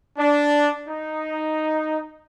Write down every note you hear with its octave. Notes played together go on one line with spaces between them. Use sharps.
D4
D#4